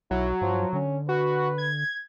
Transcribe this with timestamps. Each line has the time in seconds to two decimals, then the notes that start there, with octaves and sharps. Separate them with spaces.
0.11 B1 F#3 E4
0.41 G2 F3
0.73 D3 C#4
1.09 F#4 B4
1.58 G#6